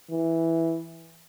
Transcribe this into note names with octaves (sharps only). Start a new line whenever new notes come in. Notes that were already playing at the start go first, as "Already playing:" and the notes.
E3